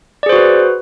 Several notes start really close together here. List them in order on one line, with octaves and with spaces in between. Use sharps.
D5 G#4 C5 F#4 B4